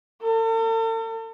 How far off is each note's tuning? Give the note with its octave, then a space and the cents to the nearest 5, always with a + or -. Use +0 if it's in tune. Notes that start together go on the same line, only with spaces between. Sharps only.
A4 +45